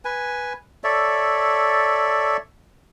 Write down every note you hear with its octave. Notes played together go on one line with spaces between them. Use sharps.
B4 G#5
A4 C#5 D5 E5